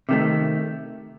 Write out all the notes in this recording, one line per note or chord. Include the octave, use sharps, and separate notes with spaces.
C3 D#3 A3